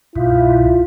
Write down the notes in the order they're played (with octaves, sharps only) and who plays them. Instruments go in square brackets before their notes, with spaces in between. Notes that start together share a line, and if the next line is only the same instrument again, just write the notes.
[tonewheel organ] C2 G2 B2 [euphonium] E4 [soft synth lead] F4